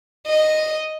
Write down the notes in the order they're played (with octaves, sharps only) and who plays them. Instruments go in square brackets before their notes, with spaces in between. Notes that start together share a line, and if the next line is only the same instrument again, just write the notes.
[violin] D#5